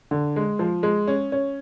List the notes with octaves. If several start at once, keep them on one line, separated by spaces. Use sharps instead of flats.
D3
G#3
F3
G#3
C#4
C#4